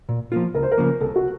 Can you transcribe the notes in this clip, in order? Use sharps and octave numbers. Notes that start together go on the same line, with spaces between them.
A#2
F3 A#3 F4
C#2 A#4
C5
A#4
C#3 F3 A#3
C2 A4
F#4